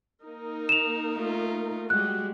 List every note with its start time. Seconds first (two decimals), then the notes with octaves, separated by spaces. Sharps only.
0.23 A#3 D#4 A#4
0.69 E7 F7
1.14 A3 F4
1.90 G3 G#3 F#4 G4 F#6